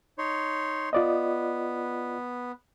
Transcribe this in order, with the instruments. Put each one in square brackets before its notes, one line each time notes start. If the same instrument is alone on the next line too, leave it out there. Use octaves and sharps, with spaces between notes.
[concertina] D#4 C#5 C6
[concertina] B3 [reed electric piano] F4 D5 D#5